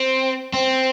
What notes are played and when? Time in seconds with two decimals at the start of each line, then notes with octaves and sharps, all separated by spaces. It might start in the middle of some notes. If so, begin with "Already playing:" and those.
Already playing: C4
0.54 C4